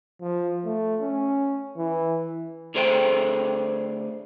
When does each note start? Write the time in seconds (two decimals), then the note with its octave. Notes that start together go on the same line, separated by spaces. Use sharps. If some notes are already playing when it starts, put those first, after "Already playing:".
0.21 F3
0.65 A3
1.01 C#4
1.77 E3
2.74 D2 D3 G#4 C5 C#5 G5